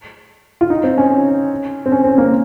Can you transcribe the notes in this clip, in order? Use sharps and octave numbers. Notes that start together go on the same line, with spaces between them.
F4
D#4
C4
C#4
C4
C#4
C4
A#3